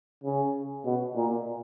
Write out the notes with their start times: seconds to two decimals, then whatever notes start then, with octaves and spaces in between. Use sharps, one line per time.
0.24 C#3
0.85 B2
1.16 A#2